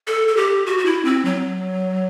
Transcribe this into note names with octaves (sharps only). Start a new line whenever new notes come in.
A4
A4
G4
F#4
F#4
E4
C4
F#3